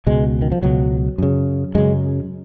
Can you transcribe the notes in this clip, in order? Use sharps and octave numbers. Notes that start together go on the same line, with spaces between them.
C#2 B2 G#3
D#3
F3
C#2 B2 F#3
F#2 C#3
F#2 C#3 G#3